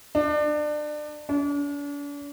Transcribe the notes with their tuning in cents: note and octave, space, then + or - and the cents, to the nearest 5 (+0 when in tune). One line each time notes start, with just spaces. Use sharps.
D4 +30
D4 -40